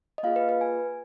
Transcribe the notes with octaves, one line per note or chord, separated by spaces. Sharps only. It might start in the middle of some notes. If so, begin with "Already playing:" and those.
D#5
A#3 F4 G#4 F5
B4
B4
G#5